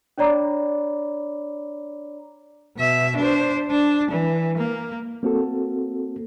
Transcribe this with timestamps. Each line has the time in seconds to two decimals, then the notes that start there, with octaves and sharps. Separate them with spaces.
0.18 D4 C#5 D5 A#5 B5 D6
2.77 B2 E5
3.17 D4 C5
3.71 D4
4.11 E3
4.58 A#3
5.23 A#3 C4 F#4 A4